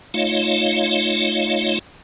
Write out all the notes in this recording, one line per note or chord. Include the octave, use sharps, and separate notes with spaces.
A3 D#4 F4 C#5 D#5 F5